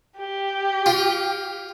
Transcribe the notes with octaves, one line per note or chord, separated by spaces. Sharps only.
G4
F4